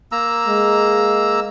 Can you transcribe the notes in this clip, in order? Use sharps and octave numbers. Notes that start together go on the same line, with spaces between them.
A#3 A#5 E6
G#3